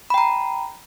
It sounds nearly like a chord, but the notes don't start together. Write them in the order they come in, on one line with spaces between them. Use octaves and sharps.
B5 G5 A#5